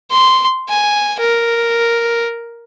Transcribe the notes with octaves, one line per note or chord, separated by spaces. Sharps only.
C6
G#5
A#4